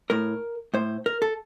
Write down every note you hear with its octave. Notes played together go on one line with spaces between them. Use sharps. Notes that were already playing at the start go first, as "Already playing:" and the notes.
A2 A#4
A2 C5
A#4
A4